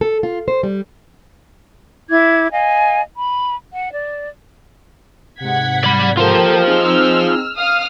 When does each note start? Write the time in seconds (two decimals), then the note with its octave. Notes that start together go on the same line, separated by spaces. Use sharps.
0.01 A4
0.23 F4
0.48 C5
0.63 G3
2.09 E4 D6 G#6
2.52 D#5 F5 G#5
3.16 B5
3.73 F#5
3.93 D5
5.40 G#2 C3 F#5 G#6 B6
5.84 D5 B5
6.17 A#3 F4 G4 A4 C5
6.66 C4 D#4 G#4 E6 F6
7.56 F5 D#6 F6